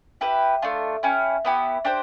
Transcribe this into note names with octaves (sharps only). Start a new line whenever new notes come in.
E4 G4 B4
A3 D4 F4
C#4 E4 G4
B3 E4 G4
D4 G4 C5